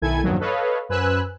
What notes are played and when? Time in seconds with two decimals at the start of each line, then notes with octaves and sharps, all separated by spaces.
0.02 B1 D#3 E4 A4 G#5 G#6
0.23 E2 G2 A#2 D#3 F3 F#3
0.40 A4 B4 C#5 D#5 F5
0.89 F#2 B4 C5 G#5 E6 F#6